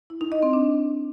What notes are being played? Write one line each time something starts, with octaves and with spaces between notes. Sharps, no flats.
E4
D#4
D#5
C4
D4